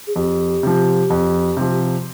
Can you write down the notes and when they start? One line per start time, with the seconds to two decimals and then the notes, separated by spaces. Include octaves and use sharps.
0.07 G#4
0.16 F2 G4
0.63 C3 F3
1.10 F2
1.57 C3 F3